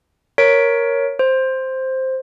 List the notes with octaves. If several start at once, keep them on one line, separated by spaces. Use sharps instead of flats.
A#4 C#5 B6 D7
C5